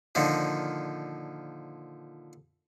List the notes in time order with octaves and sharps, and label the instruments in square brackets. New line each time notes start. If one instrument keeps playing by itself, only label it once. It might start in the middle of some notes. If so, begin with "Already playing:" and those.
[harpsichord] A#2 D3 D#3 F3